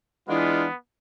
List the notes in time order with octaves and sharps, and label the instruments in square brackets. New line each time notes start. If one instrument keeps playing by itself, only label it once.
[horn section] E3 G#3 D4 F4 [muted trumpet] B3